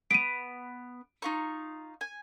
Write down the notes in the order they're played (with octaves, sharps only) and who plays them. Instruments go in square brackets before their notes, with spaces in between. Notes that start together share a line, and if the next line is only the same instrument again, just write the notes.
[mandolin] B3 [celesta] D7 D#7
[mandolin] D#4 F4 C#6
G#5